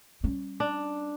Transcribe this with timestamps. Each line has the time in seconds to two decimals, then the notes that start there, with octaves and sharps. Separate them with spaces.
0.23 G3 C#4
0.60 D4